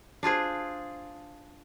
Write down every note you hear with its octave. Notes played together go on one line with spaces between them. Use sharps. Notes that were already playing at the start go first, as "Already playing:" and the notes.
D4 F4 G#4 C5